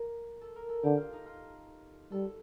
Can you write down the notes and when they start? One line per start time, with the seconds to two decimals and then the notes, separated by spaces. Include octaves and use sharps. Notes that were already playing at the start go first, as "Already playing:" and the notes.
Already playing: A#4
0.41 A4
0.56 A#4
0.69 A4
0.84 D3 G4
0.97 F4
1.13 D#4
1.26 F4
2.12 G3 A4